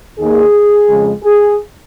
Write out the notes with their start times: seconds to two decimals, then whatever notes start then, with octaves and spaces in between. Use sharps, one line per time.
0.18 D#2 D#3 A#3 G#4
0.88 F2 C#3 G#3
1.23 G#4